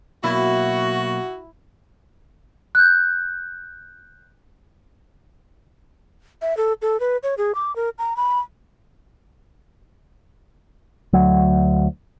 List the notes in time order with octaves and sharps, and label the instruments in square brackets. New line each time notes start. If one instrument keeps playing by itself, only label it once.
[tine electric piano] B2 F#3 A#3 [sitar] E4 [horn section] F#4
[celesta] F#6 G6
[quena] E5
A4
A4
B4
C#5
G#4
D6
A#4
A#5
B5
[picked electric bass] D2 F#3